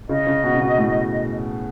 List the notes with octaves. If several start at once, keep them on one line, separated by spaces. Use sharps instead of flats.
C#3 D#5
C#3
B2
C#3
B2
A2